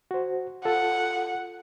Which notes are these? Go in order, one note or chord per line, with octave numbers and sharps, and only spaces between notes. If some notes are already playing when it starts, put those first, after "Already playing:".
F#4 C5
F4 A4 F#5